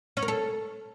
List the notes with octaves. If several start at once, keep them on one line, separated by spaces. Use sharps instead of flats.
C#4
A#4
A4